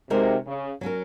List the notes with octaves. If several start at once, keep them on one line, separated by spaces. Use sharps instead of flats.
C3 G#3 D#4 F#4 A#4
C#3
F#3 C#4 F#4 A#4